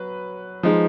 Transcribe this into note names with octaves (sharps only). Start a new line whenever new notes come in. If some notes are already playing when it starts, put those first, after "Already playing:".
Already playing: F#3 B4
F3 G#3 D#4